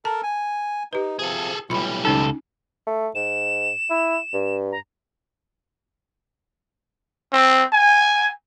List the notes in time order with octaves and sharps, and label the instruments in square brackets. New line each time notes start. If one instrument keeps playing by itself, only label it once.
[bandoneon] A4 A#4 [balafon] A5
[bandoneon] G#5
[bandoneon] D#4 [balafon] G4 B4
[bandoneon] C3 F3 [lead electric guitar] G#4 A4
[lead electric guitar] B1 G3 [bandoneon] A2 E3 [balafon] F4 B5
[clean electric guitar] C#2 A4 [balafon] C#4 D#4
[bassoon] A3
[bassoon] G#2 [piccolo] E7
[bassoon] E4
G2
[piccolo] A#5
[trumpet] C4
G#5